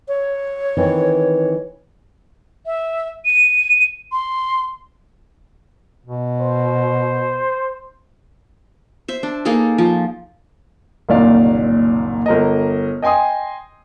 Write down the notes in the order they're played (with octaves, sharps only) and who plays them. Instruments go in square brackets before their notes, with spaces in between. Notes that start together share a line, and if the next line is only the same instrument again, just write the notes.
[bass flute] C#5
[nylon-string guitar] D#3 E3 C4
[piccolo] E5
D#7
C6
[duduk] B2
[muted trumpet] C5
[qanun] C5 E5
D4
A#3 D#4 G#4 A4
F3
[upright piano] F#1 C2 A#2 D#3 D5 F5
G1 A#4 D#5
D#5 G5 G#5 C6 D#6